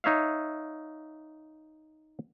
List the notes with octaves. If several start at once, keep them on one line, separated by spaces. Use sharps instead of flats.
D#4 C#5 E5 F5